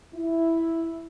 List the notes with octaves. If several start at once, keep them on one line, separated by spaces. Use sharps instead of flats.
E4